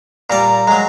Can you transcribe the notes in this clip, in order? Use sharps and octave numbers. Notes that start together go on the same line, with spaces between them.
A#2 G3 D5 A#5
F#3 G#3 A#5